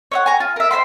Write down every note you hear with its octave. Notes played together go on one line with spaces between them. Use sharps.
C#5 D#5 F#5
G#5 A#5
F4
A#4 E5
C5 E5 B5 C6